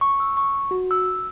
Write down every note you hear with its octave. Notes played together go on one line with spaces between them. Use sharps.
C#6
E6
C#6
F#4
E6